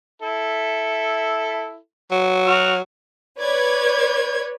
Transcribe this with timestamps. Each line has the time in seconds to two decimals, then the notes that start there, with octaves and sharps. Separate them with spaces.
0.22 E4 A4 E5
2.11 F#3
2.46 F#4 F6
3.40 B4 C#5 D5 G#6